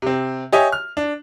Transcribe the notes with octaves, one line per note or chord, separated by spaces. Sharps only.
C3 C4
G4 C#5 D#5 E5 G#5
F6
D4